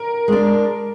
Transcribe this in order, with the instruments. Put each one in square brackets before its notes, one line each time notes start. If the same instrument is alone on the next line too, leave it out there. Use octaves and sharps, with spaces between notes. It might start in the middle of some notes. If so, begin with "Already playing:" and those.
Already playing: [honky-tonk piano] A#4
[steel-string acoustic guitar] G#3 D4